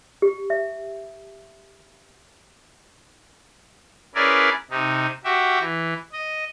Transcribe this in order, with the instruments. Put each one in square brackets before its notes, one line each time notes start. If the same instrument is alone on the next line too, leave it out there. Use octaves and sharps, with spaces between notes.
[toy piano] G4
E5
[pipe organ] C#4 E4 G#4 A#4 B4 D5
C3 D#4
F#4 G4 E5
E3
D#5